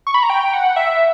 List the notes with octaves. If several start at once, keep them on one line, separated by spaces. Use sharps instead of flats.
C#6
B5
A#5
G5
F#5
E5